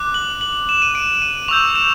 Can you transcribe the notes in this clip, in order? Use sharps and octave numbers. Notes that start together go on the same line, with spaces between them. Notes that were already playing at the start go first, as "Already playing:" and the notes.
Already playing: D6 F#6
F#7
F#7
E7
D#7
D7
D#7
C#6 E6 G6 F7
E7